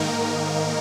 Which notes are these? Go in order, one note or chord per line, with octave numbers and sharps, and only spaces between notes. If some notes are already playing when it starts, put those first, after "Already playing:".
Already playing: G#2 D#3 A#3 D#4 A#4